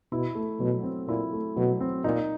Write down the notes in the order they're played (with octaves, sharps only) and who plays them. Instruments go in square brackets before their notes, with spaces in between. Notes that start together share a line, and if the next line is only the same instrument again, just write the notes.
[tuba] B2 [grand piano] E4
[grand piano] A3
[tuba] B2 [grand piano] F#3
[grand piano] C4
[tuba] A#2 [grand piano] E4
[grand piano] A3
[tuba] B2 [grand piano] F#3
[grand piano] C4
[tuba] A#2 [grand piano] D#4